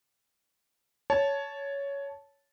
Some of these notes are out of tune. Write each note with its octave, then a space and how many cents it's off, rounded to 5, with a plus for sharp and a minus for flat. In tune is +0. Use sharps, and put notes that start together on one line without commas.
C#5 +10 A5 -10